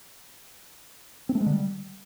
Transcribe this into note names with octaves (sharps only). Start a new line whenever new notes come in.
C4
A3
G#3
D3
G3